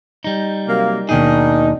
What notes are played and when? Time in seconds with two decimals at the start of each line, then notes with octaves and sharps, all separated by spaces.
0.24 G3 D#4
0.68 C3 F#3 A#3
1.09 D#2 B2 D#3 D4 D#4 G#4